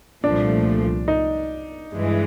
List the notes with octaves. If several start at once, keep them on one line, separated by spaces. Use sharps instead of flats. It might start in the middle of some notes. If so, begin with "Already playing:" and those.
C2 A#2 F3 A3 D4
D#4
G2 E3 G#3